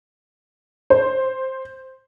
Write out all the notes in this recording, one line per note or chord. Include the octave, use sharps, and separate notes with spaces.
C5